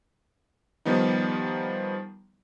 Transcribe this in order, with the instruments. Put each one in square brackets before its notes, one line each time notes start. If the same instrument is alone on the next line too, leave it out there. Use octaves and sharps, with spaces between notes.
[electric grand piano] D#3 F3 G3 B3 D#4